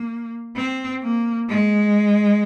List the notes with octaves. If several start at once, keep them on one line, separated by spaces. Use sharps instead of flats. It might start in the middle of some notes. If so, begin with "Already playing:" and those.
Already playing: A#3
C4
A#3
G#3